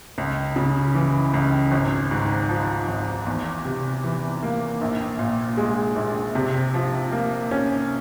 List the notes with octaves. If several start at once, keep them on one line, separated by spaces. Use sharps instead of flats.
C#2
C#3
E3
C#2
G#1
G#2
F3
G#1
E2
C3
E3
A#3
A#1
A#2
G#3
A#1
C3
F3
A#3
C#4